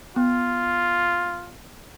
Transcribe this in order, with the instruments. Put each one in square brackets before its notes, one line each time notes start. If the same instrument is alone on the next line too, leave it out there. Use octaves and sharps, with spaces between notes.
[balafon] B3 [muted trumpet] F4